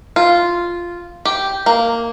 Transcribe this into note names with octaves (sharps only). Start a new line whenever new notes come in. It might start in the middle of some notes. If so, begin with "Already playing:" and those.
F4
G4
A#3